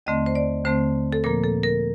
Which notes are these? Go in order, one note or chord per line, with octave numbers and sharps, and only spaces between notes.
D#2 D3 A3 C4 D#5
C5
D5
D#2 D3 A3 C4 C5
A4
A#2 F3 A#3 A#4
A4
A#4